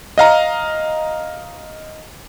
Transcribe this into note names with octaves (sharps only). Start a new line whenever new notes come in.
D#5 F5 A#5